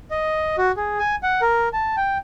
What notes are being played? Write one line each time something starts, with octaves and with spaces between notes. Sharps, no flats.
D#5
F#4
G#4
G#5
F#5
A#4
A5
G5